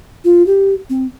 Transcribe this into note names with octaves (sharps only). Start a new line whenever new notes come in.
F4
G4
C4